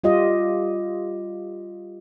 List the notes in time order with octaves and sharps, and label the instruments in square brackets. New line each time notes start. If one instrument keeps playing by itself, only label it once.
[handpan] G3 F4 G4 D#5